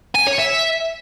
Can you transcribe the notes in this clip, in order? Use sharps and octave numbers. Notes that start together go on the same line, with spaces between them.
G#5
C#5
E5